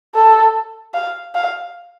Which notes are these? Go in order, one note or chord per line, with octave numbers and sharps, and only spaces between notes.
A4
F5
F5